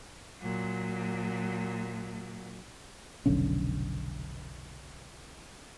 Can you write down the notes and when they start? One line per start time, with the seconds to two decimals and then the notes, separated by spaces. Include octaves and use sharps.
0.41 A#2 F#3
3.26 F1 B1 D3 C#4